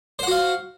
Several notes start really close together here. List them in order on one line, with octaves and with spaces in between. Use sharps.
C5 F#5 F#4 F5